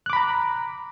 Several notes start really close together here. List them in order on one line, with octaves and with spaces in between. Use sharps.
F#6 D6 B5 A#5